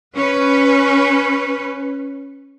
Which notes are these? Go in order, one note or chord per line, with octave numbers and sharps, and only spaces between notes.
C#4 B4